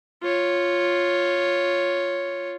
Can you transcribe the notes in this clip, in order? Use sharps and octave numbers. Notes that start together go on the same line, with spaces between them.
F4 C#5